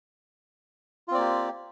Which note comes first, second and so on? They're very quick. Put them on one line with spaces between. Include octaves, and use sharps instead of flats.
F4 C4 D5 A#3 G4